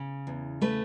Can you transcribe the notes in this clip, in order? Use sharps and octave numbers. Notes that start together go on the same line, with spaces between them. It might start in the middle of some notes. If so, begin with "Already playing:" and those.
Already playing: C#3
E2
A3 B4